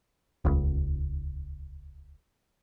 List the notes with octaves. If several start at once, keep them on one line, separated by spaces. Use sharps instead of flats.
D#1 C#2